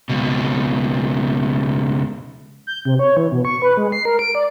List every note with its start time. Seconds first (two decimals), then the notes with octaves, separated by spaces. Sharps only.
0.09 C#2 B2
2.67 G6
2.85 C3
2.99 C#5
3.17 E3
3.32 B2
3.45 C#6
3.62 B4
3.77 G#3
3.92 C7
4.05 A#4
4.19 D7
4.35 D5